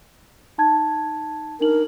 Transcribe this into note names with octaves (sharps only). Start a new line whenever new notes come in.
D#4 A5 G#6
D4 D#4 A#4 F#7